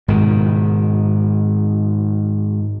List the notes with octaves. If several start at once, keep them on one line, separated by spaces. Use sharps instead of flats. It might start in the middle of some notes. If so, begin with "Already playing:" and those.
G#2 B2 D#3